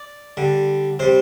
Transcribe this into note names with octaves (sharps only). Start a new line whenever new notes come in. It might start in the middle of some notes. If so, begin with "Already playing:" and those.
Already playing: D5
D3 G3
C3 G3 C5